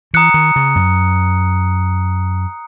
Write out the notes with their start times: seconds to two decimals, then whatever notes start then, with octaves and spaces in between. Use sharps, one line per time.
0.14 E3 A#5 D#6 F#6 C#7
0.34 D#3
0.56 C#3
0.76 F#2